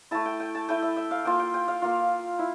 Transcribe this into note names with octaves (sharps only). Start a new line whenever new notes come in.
A3 E4 A5
G5
G5
A5
A3 E4 G5
E5
E5
F5
A#3 F4 G5
G5
G5
F5
A#3 F4
E4